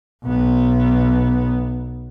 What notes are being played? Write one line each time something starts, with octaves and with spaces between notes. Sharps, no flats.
B1 B3